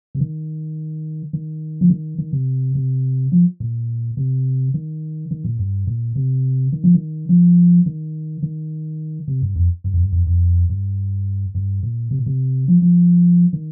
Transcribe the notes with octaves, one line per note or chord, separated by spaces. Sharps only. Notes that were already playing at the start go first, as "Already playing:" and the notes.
C3
D#3
D#3
F3
D#3
D#3
C3
C3
F3
A#2
C3
D#3
D#3
A#2
G2
A#2
C3
D#3
F3
D#3
F3
D#3
D#3
C3
G2
F2
G2
F2
G2
F2
F2
G2
G2
A#2
C3
A#2
C3
F3
F3
D#3